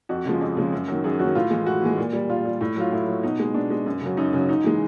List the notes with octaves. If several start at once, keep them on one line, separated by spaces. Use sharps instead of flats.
F2 F#4
C#3 F3 G#3
F2
C#3 F3 G#3
F#2
D#3 F#3
F#2 G#4
D#3 F#3 F#4
A2 F4
E3 G#3
A2 F#4
E3 G#3
A#2
G3
A#2 F4
G3
A2
F#3 F4
A2 E4
F#3
B2 D#4
G#3
B2 D4
G#3
F#2
C#3 F#3
F#2 D#4
C#3 F#3
G#2 D#4
E3 G#3